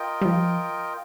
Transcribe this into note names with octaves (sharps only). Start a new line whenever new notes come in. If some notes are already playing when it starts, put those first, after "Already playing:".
Already playing: F4 A#4 D#5 G5
G3
F3